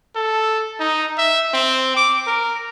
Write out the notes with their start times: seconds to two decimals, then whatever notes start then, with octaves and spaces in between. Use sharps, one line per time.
0.16 A4
0.80 D#4
1.18 E5
1.54 C4
1.97 D6
2.27 A#4